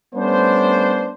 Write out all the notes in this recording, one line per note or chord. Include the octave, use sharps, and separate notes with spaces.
G3 A3 B3 C#4 D4 C5